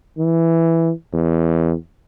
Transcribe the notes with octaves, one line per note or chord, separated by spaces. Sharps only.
E3
E2